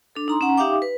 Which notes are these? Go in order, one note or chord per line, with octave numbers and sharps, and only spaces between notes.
D4 A4
D#4 A#5 C6
C#4 F#5 A#5
D#4 G4 E5 F5 G5 D6
B4